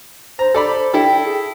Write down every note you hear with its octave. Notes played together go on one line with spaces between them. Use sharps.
C5 A#5
A4 D5 B5
E4 A4 G5
G#4